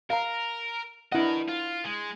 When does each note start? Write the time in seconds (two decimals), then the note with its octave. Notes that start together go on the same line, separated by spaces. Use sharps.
0.10 A#4 F5 A#5
1.12 D4 E4 A#4 D#5 F#5
1.48 F4
1.84 G#3